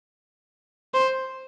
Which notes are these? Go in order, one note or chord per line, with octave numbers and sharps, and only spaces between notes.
C5